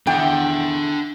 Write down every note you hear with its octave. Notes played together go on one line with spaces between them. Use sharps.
E2 D4 F#5 G5